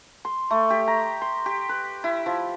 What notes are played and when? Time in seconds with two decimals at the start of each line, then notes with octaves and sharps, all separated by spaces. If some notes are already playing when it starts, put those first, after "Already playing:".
0.25 C6
0.51 A3
0.70 G4
0.88 A#5
1.22 C6
1.46 G4
1.69 B4
2.04 E4
2.26 F3